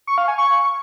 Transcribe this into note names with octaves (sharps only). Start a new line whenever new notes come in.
C#6
F5
G#5
C#6